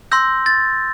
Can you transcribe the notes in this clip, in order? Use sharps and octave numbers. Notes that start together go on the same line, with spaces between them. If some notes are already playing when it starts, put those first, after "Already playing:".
C6 E6 G6 A#6
A6